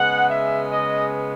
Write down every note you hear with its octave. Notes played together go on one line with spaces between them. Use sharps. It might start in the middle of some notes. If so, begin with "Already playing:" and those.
Already playing: C#3 G#3 B3 F#5
E5
D#5